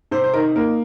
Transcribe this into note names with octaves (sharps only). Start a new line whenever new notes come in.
C3 C5
C5
D#4 A#4
A#3 A#4